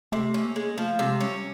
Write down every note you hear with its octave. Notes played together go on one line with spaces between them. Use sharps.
C3 A3
C#4
A#3
G#3
F3 A3
C3 G#3
G3 C#4